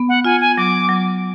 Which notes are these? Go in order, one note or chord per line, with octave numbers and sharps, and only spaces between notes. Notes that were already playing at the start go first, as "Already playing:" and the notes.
Already playing: B3
F#5
F4 G#5
G#5
F#3 D6
F#3